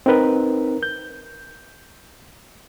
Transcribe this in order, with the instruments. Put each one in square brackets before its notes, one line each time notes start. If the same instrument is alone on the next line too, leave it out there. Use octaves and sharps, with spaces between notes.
[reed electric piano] C4 D#4 A#4 B4
G6